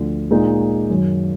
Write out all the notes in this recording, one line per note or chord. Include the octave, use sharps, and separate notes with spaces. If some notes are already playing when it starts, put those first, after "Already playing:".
Already playing: D2 D3 F3
A#2 G#3 D#4 A#4
F#2 D#3 F#3